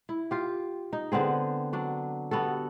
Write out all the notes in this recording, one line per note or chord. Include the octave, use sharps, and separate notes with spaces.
E4
F4 G4
D#4
D3 B3 C4 G#4
F#3 D4
G3 B3 F#4 A4